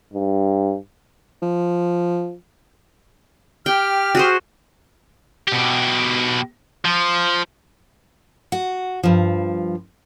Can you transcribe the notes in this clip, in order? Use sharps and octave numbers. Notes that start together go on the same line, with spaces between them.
G2
F3
G4 G5 F6
F#4 G#4 C5
B2 G4
F3
F#4
G2 F3